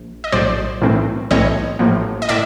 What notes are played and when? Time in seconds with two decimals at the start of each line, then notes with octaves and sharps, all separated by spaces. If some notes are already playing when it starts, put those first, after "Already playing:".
Already playing: A#1
0.24 D#5
0.32 A#1 A2 F#3 C5 D5
0.82 B1 A2 E3 A3 C4
1.31 B1 A2 E3 A3 C4 C#5 D#5
1.79 A1 A2 F3 A#3
2.22 D#5
2.29 A2 D5 E5